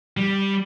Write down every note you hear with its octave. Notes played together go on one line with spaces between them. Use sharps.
G3